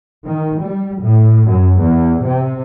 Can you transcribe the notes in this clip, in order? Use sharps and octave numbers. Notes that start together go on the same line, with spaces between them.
D#3
G3
A2
F#2
E2
C3